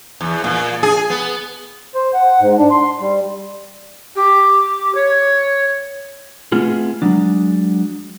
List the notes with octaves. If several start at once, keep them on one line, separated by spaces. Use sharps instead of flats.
E2
A#2
G#4
B3
C5
F#5
G#2
D4
C6
G3
G4
C#5
A3 B3 C4 F4 G#4
F#3 G#3 D4